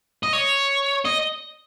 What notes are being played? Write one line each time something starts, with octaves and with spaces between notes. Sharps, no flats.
D#5
C#5
D#5